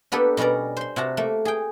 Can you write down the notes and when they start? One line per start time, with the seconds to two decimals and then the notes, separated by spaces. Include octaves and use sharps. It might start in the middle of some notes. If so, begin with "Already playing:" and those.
0.12 A#3 B3 D4 G4 A4
0.37 B2 G3 C#4 A#4 D5
0.77 C5 C6
0.96 C3 F#4 A5 A#5
1.17 A3 A#3
1.45 G#4 G5